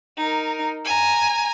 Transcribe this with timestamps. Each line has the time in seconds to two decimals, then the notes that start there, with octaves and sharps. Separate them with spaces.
0.17 D#4 A#4
0.85 G#5 A#5